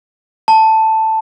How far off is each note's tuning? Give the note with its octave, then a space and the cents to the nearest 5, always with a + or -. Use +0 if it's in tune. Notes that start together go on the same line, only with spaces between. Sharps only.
A5 +5